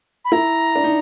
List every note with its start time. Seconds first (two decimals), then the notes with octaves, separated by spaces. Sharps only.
0.25 B5
0.32 E4 A#5
0.75 D4
0.84 D#4